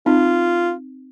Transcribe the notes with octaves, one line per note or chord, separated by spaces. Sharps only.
C4 D#4 F4